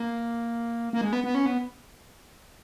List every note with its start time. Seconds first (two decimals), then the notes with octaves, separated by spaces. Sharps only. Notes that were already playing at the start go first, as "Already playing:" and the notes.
Already playing: A#3
0.93 A#3
1.01 G#3
1.13 B3
1.24 B3
1.35 C#4
1.46 B3